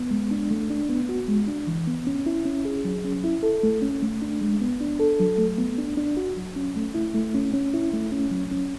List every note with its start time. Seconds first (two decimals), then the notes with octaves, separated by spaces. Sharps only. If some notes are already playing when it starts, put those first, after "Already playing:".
Already playing: B3
0.11 G#3
0.31 D4
0.51 A3
0.70 D4
0.89 B3
1.09 F#4
1.28 G#3
1.48 D4
1.67 E3
1.87 B3
2.07 C#4
2.26 E4
2.45 C#4
2.65 G#4
2.85 F#3
3.04 C#4
3.24 E4
3.43 A4
3.63 A3
3.82 C#4
4.02 A3
4.22 D4
4.41 G#3
4.61 B3
4.81 D4
4.99 A4
5.20 F#3
5.38 A3
5.58 B3
5.78 D4
5.97 D4
6.17 F#4
6.37 F#3
6.56 C#4
6.76 A3
6.94 E4
7.15 A3
7.35 C#4
7.54 C#4
7.74 E4
7.93 A3
8.12 C#4
8.31 F#3
8.51 C#4